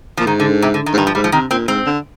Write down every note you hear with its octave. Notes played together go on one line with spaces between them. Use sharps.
A#2 F3
G#2 D#3
D3
C3
D3
D#3
G#2
G2 D#3
F3
G#2 G3
F3
C3 D#3
A#2 C4
G#2 C4
D3